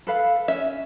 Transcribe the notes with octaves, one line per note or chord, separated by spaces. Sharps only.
A4 B4 F5
C#4 E5